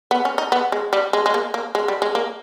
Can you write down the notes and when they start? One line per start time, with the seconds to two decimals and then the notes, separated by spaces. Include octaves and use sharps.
0.11 B3
0.25 C#4
0.38 D#4
0.52 B3
0.72 G#3
0.93 G3
1.13 G#3
1.26 G#3
1.34 A#3
1.54 A#3
1.75 G#3
1.88 G3
2.02 G#3
2.15 A#3